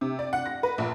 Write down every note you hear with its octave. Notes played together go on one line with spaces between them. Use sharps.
C3
D5
F#5
A#6
B4
A#1